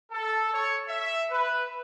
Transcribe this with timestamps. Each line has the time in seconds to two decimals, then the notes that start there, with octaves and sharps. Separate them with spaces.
0.11 A4
0.53 C#5
0.88 E5
1.30 B4